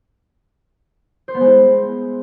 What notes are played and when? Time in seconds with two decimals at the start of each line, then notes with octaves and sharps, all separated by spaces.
1.28 C5
1.34 B3
1.41 G#3
1.47 E4